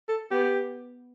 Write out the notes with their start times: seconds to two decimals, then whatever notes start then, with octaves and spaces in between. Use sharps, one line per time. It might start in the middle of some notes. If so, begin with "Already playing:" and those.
0.09 A4
0.31 B3 G4